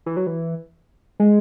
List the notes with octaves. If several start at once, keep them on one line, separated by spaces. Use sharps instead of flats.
E3
F#3
E3
G#3